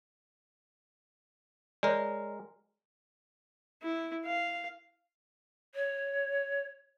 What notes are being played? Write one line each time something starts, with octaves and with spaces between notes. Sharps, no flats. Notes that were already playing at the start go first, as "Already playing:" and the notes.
G#3 A#4 C#5 D5
E4
F5
C#5